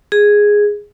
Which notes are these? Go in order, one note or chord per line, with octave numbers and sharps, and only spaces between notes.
G#4